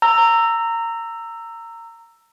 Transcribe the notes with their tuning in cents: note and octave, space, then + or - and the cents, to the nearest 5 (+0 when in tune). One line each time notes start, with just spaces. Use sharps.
A#5 -20 E6 +10